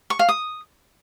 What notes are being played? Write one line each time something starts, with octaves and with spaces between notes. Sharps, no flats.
C#6
F5
D#6